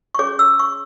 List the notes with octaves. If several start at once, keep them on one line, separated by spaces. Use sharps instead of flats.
C#6
C#4 G#4 C#5 D6
E6
C#6